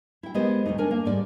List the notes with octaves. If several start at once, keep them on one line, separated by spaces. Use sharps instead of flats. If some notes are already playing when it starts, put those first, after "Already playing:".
E4 G5
G#3 B3 G4 A#4 C5 D#5
D2 A2 F#3 D#4
D4 A#4 G#5
A#3
G#2 G3 D5